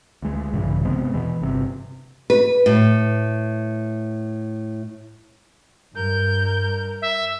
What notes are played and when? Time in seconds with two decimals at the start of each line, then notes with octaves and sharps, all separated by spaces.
0.22 D2 G#3
0.53 A#1 G2 C#3 E3
0.85 G#1 C3 G#3 B3
1.14 E2 B2 E3
1.41 G1 C3
2.30 B4
2.66 A2
5.95 G2 A#4 G6
7.02 E5